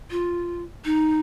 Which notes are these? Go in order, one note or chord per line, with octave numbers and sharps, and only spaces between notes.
F4
D#4